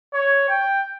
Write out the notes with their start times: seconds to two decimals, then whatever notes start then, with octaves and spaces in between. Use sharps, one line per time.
0.14 C#5
0.49 G5